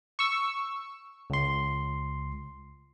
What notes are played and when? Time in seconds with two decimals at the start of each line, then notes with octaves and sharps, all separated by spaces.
0.19 C#6 E6
1.30 C#2 C6